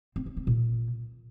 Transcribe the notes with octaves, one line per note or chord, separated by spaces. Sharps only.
C4
C#4
C4
A#2